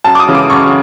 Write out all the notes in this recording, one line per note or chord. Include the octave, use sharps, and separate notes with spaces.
F#2 A5
D6
D#6
C#3 E3 G#3
D6
F#2 C#6